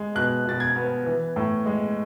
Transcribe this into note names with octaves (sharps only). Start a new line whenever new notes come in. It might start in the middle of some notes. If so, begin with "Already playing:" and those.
Already playing: G#3
B2 F#6
B2 A6
G#6
B3
E3
A2
G#3